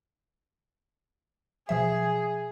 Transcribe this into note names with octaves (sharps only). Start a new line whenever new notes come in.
B2 F3 G#4 E5